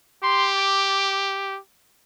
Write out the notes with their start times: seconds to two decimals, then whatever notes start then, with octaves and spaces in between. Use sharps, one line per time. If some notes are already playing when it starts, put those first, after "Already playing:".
0.23 G4 C6
0.56 D6
0.89 D6